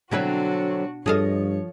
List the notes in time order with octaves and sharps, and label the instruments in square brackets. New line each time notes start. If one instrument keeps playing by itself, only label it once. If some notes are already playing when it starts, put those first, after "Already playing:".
[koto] B2 E4 B4 [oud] D3 F#3 C4 [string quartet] D4 F#4
[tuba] G2 [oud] F3 D#5 [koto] G#4 A4 F5 [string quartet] C#5